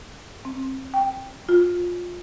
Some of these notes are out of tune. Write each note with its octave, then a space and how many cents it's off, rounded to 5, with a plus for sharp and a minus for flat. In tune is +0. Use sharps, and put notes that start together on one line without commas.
C4 +25
G5 +5
F4 +15